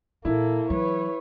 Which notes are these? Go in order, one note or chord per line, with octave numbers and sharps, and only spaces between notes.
A#2 E3 A#3 E4 A4
E3 F#3 B4 C#5